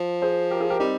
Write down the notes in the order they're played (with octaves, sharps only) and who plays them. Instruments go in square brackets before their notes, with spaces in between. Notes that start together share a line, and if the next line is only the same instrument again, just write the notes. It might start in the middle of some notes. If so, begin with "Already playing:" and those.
Already playing: [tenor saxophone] F3
[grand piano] G#4 C5
G4 A#4
F4 G#4
G4 A#4
[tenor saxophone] G3 [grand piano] C4 D#4